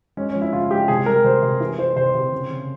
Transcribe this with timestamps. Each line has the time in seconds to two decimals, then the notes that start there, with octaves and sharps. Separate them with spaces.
0.17 G#3 C#4
0.30 C#4
0.35 F3
0.41 E4
0.53 C#3 F4
0.71 G#3 G4
0.88 C3 G#4
1.06 G3 A#4
1.24 C3 C5
1.42 C3
1.61 E3
1.79 E3 C5
1.96 C3 C5
2.15 C3
2.32 C#3
2.50 C#3